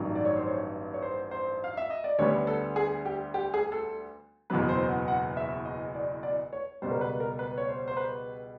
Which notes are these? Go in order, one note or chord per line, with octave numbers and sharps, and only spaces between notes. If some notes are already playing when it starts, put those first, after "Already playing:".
Already playing: A1 G2 D#3 F#3
D5
C#5
C5
C#5
C#5
C5
C5
F5
E5
D#5
D5
D2 D3 G3 B3 C#5
A4
G#4
G4
G4
G#4
A4
F#1 E2 B2 F#3 B3 B4
C5
F#5
F#5
E5
D#5
D5
D5
C#5
C#2 B2 G3 C5
A#4
B4
A#4
B4
C#5
C5
C5
B4